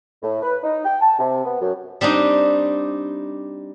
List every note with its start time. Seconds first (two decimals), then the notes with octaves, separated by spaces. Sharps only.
0.23 A2
0.42 B4
0.63 D#4
0.84 G5
1.01 A5
1.19 C3
1.45 B3
1.61 F#2
2.01 G3 C4 D4 D#4